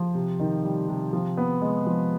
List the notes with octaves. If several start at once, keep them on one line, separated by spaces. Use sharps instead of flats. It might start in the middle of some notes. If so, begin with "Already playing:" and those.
Already playing: F3
C3
D#3
G3
C3
F3
B3
G#3
F3